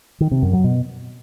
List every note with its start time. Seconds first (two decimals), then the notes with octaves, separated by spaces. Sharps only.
0.20 D#3
0.31 C3
0.42 F#2
0.53 F#3
0.64 B2